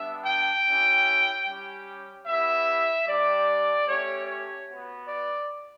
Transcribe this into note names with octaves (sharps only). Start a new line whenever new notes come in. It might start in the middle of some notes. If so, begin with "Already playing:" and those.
Already playing: G3 B3 D4 E5
G5
C#4 E4 G4
G3 C#4 G4
B3 E4 G4 E5
G3 D4 G4 D5
A3 C#4 G4 C#5
C#5
B3 F#4
D5